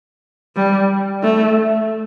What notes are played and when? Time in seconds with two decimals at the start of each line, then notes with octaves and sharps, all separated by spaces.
0.56 G3
1.23 A3